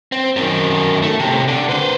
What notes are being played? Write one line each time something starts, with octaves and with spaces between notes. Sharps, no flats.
C4
F#2 D#3
A3
A2 C3
D3
B4 C5